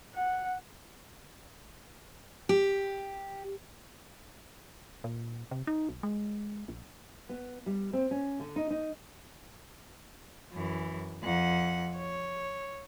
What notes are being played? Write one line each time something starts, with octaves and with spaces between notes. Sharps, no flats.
F#5
G4
A#2
C3
D#4
B1
G#3
A#1
B3
G3
C4
C#4
D3
D#4
D#4
F#2 E3
F2 F#5
C#5